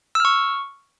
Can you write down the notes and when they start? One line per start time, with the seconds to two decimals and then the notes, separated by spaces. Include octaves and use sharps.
0.15 E6
0.20 F6
0.25 C#6